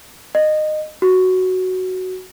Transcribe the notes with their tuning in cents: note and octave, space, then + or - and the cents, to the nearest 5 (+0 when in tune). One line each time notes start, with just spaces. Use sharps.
D#5 -20
F#4 +5